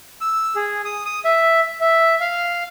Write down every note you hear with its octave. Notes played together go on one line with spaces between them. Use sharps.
E6
G#4
D#6
D#6
E5
E5
F5